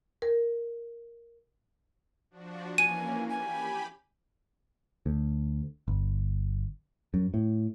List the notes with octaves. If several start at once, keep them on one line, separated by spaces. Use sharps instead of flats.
A#4
F3 D4 F#4
E3 A#3 C#4 G#5 D#7
G4 G#5 B5
D2
G1
F#2
A2